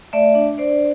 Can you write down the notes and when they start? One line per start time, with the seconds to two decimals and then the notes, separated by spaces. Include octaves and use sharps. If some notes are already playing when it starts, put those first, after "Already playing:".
0.13 A3 D5 E5
0.35 D4
0.58 D4 C5 D5